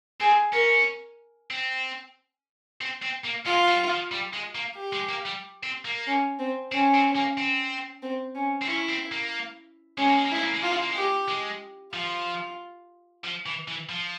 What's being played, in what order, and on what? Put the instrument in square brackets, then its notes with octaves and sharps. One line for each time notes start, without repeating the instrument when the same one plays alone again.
[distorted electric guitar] C4 [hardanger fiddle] G#4
[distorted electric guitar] C#4 [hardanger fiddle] A#4
[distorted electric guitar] C4
C4
C4
A#3
[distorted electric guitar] G#3 [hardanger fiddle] F4
[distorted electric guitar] G3
F3
G3
G#3
A#3
[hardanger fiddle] G4
[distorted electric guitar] G#3
A#3
G3
C4
A#3
[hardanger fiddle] C#4
C4
[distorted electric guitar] C4 [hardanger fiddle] C#4
[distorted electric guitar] C4
A#3
C4
[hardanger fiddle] C4
C#4
[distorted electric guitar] C4
[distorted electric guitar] C#4 [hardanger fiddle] E4
[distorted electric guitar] C4
A#3
[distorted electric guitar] G#3 [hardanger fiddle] C#4
[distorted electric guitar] A#3
G#3
A#3
[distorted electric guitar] G#3 [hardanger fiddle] E4
[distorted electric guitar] A#3
G#3
[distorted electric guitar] A#3 [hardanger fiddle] F4
[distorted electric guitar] G#3
A#3
G#3
[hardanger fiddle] G4
[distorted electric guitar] G#3
[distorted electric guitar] F3 [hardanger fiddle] F4
[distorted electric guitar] F3
E3
E3
F3